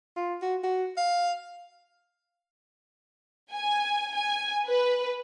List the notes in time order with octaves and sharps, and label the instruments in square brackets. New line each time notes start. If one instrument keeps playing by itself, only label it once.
[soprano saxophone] F4
F#4
F#4
F5
[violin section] G#5
G#5
B4